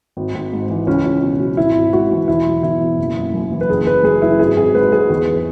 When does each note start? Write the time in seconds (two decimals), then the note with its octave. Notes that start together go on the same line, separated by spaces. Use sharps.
0.17 G#1
0.35 G#1
0.52 G#2
0.69 E3
0.87 C#2 C#4
1.05 C#2
1.23 B2
1.39 F#3
1.57 G#1 E4
1.75 G#1
1.92 G#2 F#4
2.11 E3
2.28 E1 E4
2.46 F#3
2.63 E2 E4
2.81 B2
2.98 F#1
3.16 F#1
3.34 F#2
3.52 E3
3.61 B4
3.69 F#1 G#4
3.86 F#1 B4
4.04 F#2 G#4
4.22 F#3 E4
4.39 G#1 G#4
4.57 G#1 G#4
4.75 G#2 B4
4.92 F#3 G#4
5.10 E2